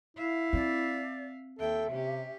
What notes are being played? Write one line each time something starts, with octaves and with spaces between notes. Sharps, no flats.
E4 E5 F5
C4 D5
D#2 A4 E5 G5
C3 C#4 G4